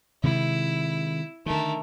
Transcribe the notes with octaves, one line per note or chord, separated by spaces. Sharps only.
C3 D#3 G#3 E4
D3 D#3 A3 A#4